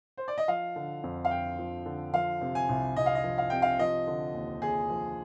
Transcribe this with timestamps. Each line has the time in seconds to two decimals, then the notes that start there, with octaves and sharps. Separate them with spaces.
0.17 C5
0.28 D5
0.38 D#5
0.48 F3 F5
0.76 D3
1.03 F2
1.25 F5
1.31 F2 G5
1.59 F3
1.85 D3
2.13 F3 F5
2.41 C3
2.55 G#5
2.69 C2
2.96 C2 D#5
3.06 F5
3.15 D#5
3.24 F3
3.38 F5
3.50 C3 G5
3.62 F5
3.79 F3 D#5
4.07 D3
4.34 D#2
4.62 D#2 G#4
4.90 F3